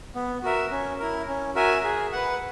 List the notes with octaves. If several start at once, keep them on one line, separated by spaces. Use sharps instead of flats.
B3
F#4 A#4 E5
C#4
E4 A#4
C#4
F#4 A#4 E5 G#5
G#4
B4 F#5